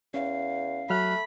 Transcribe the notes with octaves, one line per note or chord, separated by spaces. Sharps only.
E2 C#4 F5
F#3 A3 B5 F6 F#6